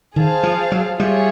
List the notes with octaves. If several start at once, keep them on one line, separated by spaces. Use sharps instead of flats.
D#3 G#4 C5 F5 A5
F3
F#3
G3 F4 G#4 C#5 E5